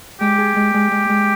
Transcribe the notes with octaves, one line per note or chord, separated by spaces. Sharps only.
G#3 G4
G#4
G#3
G#3
G#3
G#3